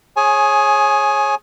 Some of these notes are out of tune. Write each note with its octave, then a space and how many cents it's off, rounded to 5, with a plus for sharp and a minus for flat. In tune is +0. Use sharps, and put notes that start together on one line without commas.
G#4 +0 C#5 -20 G#5 +15